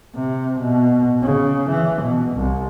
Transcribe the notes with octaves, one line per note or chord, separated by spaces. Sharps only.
C3
B2
C#3
E3
B2
C2